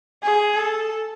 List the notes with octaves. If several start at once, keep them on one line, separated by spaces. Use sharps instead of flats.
G#4
A4